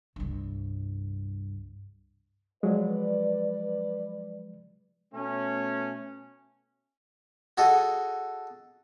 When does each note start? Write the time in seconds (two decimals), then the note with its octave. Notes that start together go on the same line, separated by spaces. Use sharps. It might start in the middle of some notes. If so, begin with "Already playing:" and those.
0.16 C2 G2
2.63 F3 F#3 G#3 B4 D5
5.14 B2 A3 C#4
7.58 F#4 G#4 A4 D#5